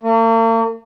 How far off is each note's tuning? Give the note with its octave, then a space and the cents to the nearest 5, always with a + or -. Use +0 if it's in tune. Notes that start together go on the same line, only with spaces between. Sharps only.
A#3 -45